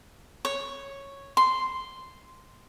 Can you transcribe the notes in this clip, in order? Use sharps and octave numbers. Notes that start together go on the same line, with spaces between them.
C#5
C6